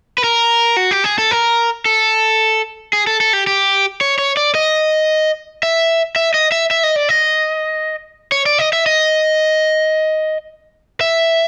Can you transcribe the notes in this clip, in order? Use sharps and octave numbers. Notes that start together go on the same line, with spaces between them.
B4
A#4
F#4
G4
G#4
A4
A#4
A4
G#4
A4
A4
G4
G4
C#5
C#5
D5
D#5
E5
E5
D#5
E5
E5
D#5
D5
D#5
C#5
D5
D#5
E5
D#5
E5